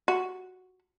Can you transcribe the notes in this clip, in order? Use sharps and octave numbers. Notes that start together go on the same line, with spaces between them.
F#4